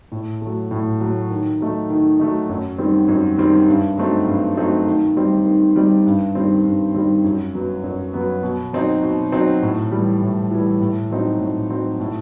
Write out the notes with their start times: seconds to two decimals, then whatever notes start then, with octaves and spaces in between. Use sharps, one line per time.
0.12 A2
0.41 F#3 A3
0.71 A2
1.00 F#3 A3
1.31 D#3
1.60 F#3 A3 D#4
1.90 D#3
2.20 F#3 A3 D#4
2.49 F#2
2.78 D#3 G3 C4
3.08 F#2
3.38 D#3 G3 C4
3.68 G2
3.97 F#3 A3 C4 D#4
4.27 G2
4.57 F#3 A3 C4 D#4
4.86 D#3
5.17 G3 C4 D#4
5.46 D#3
5.76 G3 C4 D#4
6.06 G2
6.35 D#3 G3 C4
6.65 G2
6.94 D#3 G3 C4
7.24 F#2
7.54 F#3 B3
7.84 F#2
8.13 F#3 B3
8.43 B2
8.73 F#3 C4 D#4
9.03 B2
9.32 F#3 C4 D#4
9.62 A2
9.92 E3 G3
10.22 A2
10.51 E3 G3
10.81 A2
11.10 F#3 C4 D#4
11.40 A2
11.70 F#3 C4 D#4
12.00 A2